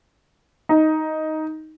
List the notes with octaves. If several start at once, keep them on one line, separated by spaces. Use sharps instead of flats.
D#4